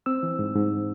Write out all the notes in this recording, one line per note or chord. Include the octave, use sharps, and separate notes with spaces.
C4 E6
E3
G#2
G#2